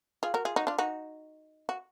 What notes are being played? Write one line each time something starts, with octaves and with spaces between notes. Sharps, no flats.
F4 G#4
F#4 A#4
F4 G#4
D#4 F#4
D4 F4
D#4 F#4
F#4